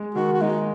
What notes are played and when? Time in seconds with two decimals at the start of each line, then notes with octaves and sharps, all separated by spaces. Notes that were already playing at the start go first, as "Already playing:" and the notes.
Already playing: G#3
0.15 D#3 F#4
0.33 F#4
0.41 G#3 D#4